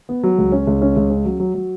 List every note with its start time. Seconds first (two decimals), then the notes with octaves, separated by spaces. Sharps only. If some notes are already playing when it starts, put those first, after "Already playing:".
0.09 B3
0.23 F#3
0.38 C#2
0.52 C#4
0.67 C#2
0.82 C#4
0.96 C#2
1.10 C#4
1.25 F#3
1.40 F#3
1.54 F#3